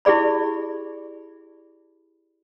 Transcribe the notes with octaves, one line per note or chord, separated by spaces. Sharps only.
E4 G4 G#4 D5 B5